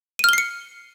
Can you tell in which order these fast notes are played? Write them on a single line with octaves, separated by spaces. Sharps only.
D#7 F6 G7 C7 C#7